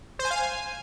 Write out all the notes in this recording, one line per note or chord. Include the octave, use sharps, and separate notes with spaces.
C5
G#5
F5
G#5